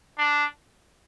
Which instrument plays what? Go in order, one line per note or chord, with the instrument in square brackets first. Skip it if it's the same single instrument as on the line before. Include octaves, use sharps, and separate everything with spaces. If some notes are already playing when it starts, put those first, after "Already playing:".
[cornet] D4